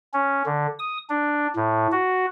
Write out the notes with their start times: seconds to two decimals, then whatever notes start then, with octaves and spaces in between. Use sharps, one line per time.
0.13 C#4
0.46 D3
0.79 D#6
1.10 D4
1.56 A2
1.92 F#4